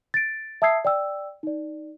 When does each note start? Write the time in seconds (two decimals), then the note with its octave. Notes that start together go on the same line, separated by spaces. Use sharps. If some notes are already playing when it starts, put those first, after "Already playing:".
0.14 A6 D7
0.62 E5 A5 D#6 E6 G#6 C7
0.85 D5 G5 E6
1.43 D#4 D5